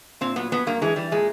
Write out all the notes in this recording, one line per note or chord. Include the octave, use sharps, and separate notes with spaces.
A#2 C4
F#3 B3
F#3 B3
G2 A#3
E3 G#3
E3 G3
A#2 G#3